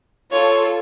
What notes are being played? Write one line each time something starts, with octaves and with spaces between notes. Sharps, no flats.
F4 A4 C#5